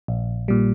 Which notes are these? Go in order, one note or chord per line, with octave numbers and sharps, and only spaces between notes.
A#1
A#2 G3